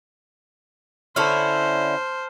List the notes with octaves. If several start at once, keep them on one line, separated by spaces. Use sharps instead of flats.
D3 C#4 E4 C5 A5 F6